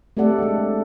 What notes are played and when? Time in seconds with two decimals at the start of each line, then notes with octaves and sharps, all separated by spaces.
0.17 A3 C4 G4 A4 D5 F#5
0.38 G#3 D4